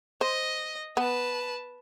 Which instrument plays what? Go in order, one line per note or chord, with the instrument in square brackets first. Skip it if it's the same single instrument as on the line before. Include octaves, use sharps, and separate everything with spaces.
[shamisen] C5 [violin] D#5
[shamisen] B3 [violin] B4 A5